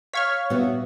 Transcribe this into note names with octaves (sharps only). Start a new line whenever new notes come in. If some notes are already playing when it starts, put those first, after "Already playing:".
C#5 F5 C#6 F6 G#6 B6
A#2 G3 B3 F#4 E5